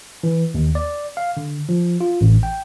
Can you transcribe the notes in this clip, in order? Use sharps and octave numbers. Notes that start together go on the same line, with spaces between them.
E3
D#2
D5
F5
D3
F3
F4
A1
G5